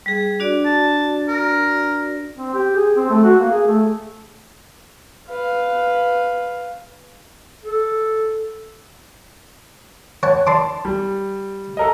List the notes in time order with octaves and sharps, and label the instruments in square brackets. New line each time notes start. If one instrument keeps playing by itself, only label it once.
[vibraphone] G3 G#4
D4 F#4 D5
[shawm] A5
A#4
[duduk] C4
G4
G#4
C4
A3
F#4
A#3
G#4
A3
[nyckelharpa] B4 F5
[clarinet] A4
[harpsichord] C#5 F#5 A5
[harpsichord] D5 C6 D6 [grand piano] A5
[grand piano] G3
A4 A#4 D#5